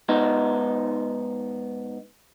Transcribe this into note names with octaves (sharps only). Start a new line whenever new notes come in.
G#2 B3 D#4